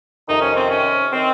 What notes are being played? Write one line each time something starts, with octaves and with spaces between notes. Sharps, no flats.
F2 C3 D#3 D#4
C#4
C4
C#4
D#3 C4